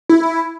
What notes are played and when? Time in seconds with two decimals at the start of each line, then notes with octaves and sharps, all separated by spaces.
0.09 E4